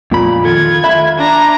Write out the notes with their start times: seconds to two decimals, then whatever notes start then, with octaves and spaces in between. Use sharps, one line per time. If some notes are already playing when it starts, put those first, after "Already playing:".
0.11 F2 A#2 B5
0.45 D#3 F4 A4 G#6
0.84 E5 B5
1.18 D4 A#5